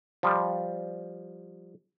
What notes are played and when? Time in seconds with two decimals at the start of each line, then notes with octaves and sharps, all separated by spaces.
0.23 F3 G3